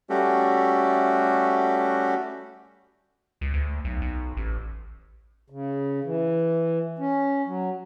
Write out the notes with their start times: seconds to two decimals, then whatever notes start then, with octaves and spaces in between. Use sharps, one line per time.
0.10 G3 A3 C#4 F#4 G4 A4
3.41 C#2
3.54 D2
3.85 B1
4.02 B1
4.37 A1
5.50 C#3
6.04 E3
6.99 C#4
7.46 F#3